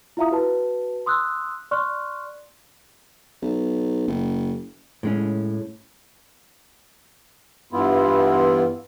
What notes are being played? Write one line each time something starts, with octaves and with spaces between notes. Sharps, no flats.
E4 F4 E5 F5 A#5 D#6
F#4 B4 A5
C6 D#6 E6 F#6
D5 C6 C#6 F6 F#6
B1
F#1
A2 G#3 C#4
G2 E3 B3 E4 F4